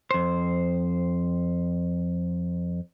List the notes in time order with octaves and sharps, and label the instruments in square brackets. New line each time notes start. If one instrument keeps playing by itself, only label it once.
[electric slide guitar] F2 C5